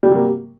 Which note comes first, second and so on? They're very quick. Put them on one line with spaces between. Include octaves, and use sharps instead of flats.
G3 C3 F#3 A#3